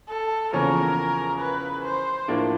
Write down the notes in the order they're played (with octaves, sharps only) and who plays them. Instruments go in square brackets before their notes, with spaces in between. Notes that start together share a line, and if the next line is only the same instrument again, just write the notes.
[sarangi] A4
[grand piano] E2 C#3 F3 A#3 C#4 [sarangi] A#4
[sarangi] B4
C5
[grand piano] A2 F3 A#3 D4